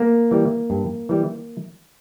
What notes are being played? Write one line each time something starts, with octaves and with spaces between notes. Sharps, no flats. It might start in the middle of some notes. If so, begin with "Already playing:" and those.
Already playing: A#3
E3 G3
G2
E3 G3